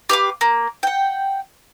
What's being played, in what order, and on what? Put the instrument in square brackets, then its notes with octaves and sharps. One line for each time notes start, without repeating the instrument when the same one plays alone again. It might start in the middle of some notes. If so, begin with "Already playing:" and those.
[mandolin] G4 B4 F5 D6
A#3
F#5 G5